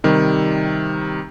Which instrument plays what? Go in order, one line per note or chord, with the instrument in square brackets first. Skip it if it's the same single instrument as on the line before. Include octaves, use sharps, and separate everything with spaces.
[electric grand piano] C3 D#3 G3